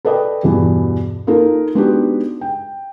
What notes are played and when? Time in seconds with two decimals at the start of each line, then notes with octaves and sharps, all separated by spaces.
0.05 A4 B4 D5 D#5 G5
0.43 E2 G2 B2 E3
1.27 A#3 D#4 F4 A4 A#4
1.75 G#3 B3 D4 D#4 F#4 G4
2.41 G5